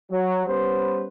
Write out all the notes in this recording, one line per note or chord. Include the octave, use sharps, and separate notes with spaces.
F#3
G3 B3 C#4 B4 C5